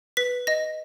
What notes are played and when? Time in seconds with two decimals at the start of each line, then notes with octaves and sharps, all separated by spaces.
0.17 B4 B6
0.47 D#5 A#6